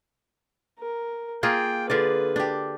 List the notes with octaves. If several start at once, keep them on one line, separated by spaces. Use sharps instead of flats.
A#4
A#3 F4 G#4 G5
D3 F4 G#4 B4 D5
D4 G4